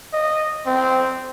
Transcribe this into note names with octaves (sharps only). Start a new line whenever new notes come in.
D#5
C4